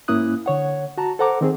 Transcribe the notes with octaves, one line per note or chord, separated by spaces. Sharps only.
G#2 A#3 C#4 E4 D#6 F#6
D3 C#5 F#5
F#4 A5 A#5
A4 C5 F#5 A#5 D6
D#3 C4 G#4